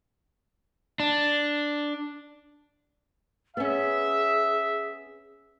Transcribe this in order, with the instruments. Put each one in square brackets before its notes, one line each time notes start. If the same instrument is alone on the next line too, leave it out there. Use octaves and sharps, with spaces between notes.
[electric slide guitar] D4
[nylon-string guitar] B3 C#4 [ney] G#4 [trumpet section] E5